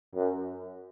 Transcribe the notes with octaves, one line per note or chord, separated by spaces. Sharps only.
F#2